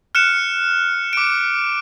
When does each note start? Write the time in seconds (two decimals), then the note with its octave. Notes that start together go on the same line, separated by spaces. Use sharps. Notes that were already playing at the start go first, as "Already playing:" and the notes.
0.15 F6 F#6 C#7 E7
1.13 D6 D7